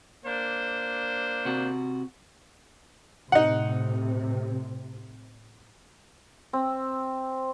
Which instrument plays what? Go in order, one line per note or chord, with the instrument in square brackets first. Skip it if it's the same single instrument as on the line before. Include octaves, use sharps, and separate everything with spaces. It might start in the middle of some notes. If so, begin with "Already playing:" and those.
[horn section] A#3 D4 C5
[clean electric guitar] C3 F#4
[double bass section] A2 C3 [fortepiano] D#4 F#5
[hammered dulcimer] C4